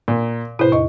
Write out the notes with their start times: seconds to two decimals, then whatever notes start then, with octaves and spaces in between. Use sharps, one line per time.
0.08 A#2
0.59 A2 C3 E4 B4 C5
0.72 E2 D#5 C#6